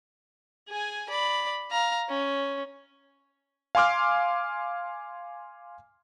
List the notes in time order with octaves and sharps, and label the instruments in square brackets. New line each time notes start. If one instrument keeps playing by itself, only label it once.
[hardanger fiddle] G#4 G#5
D5 B5
F5 A#5
C#4
[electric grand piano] F5 G#5 C6 D6 F6